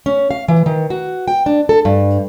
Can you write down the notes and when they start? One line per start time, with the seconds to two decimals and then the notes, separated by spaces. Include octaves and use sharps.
0.06 C#4
0.31 F5
0.48 E3
0.66 D#3
0.90 F#4
1.28 G5
1.46 D4
1.69 A4
1.85 G2